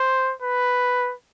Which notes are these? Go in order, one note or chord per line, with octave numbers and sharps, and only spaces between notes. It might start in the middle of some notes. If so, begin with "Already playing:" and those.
Already playing: C5
B4